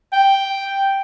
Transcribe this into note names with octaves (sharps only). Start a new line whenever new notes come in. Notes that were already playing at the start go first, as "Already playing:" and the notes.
G5